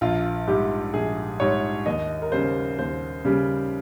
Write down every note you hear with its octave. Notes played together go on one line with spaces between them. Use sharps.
A#1 F4
G#2 G3 G4
A#1 G#4
G#2 G3 C#5
D#2 D#5
A#4
C#3 G3 C5
D#2 C5
C#3 G3